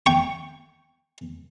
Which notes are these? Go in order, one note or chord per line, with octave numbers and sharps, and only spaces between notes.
G5 C#6